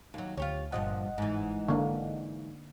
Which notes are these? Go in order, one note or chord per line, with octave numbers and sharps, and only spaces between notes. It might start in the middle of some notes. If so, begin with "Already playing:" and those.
D#2 F#3
D2 F4 G4 C#5
G1 G2 A#2 F3 D#5 F#5
G#2 E3
D3 A#3